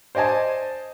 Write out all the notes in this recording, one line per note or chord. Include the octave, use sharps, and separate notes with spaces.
C5 D5 D#5 G#5 A5